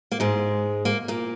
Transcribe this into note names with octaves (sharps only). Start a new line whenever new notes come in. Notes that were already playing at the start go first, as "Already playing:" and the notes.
A#3
G#2 G#3
A#3
A#2 A#3